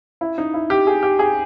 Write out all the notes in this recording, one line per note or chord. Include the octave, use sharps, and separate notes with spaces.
E4
D#4
E4
G4
G#4
G4
G#4